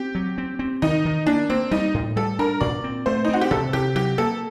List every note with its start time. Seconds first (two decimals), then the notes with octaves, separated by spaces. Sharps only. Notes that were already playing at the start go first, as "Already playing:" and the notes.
Already playing: C4 G4
0.15 F#3
0.38 C4
0.59 C4
0.82 D#3 D#4
1.05 D#3
1.26 A#3 D4
1.50 A#3 C4
1.71 G3 D#4
1.94 A2
2.16 G3 A4
2.39 D4 A#4
2.61 A#2 D5
2.84 C4
3.06 A3 C5
3.25 D#4
3.29 C4 F#4
3.41 G4
3.51 C3 A4
3.73 C3 G4
3.95 F#3 G4
4.18 A#3 A4